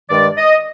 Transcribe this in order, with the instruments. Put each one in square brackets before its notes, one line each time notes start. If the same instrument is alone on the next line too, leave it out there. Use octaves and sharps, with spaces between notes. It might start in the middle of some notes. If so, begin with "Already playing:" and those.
[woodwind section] G2 D#3 G#3 D5
D#5